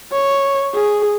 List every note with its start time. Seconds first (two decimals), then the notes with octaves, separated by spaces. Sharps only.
0.12 C#5
0.74 G#4